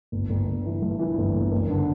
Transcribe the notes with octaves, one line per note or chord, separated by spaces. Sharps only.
G1
G1
G1
E3
G2
E3
G1
G1
F#1
D3